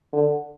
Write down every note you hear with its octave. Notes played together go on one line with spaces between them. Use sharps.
D3